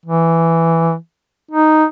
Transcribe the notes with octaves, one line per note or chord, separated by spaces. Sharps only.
E3
D#4